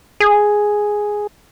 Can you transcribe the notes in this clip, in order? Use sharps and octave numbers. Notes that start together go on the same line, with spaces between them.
G#4